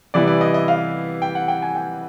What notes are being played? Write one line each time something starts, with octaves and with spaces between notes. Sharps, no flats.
C3 E3 G3 B3 E4 D5
D5
D#5
D#5
F5
G5
F#5
G5
G#5
G5